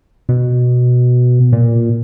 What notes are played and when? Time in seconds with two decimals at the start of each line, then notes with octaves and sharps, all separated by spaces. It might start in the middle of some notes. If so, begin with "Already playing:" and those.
0.29 B2
1.53 A#2